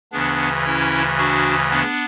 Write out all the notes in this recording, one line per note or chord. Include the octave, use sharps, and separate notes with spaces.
D2 C#3 E3 B3 D4
C#4 E4
D4 F#4
B3 D4